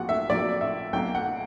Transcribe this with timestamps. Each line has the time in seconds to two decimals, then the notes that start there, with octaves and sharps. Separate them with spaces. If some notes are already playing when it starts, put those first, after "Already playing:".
Already playing: A#1 A#2 F#3 F#5
0.09 E5
0.29 A#1 A#2 F#3 A#3 D5
0.61 E5
0.93 B1 A#2 A#3 G5
1.15 F#5